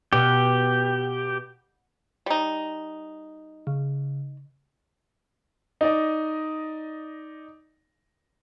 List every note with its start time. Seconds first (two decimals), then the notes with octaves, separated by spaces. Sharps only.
0.13 B2 G4
2.26 G3 D#4
3.67 C#3
5.81 D#4 D5 D#5